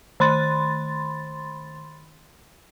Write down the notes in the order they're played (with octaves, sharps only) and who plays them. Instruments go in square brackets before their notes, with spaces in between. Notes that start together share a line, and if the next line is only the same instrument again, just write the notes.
[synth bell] D#3 B5 C6 A6